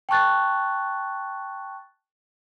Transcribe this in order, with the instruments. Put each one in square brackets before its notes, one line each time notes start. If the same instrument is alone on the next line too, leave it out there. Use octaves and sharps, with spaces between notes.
[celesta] G5 A5 C#6 F#6 A6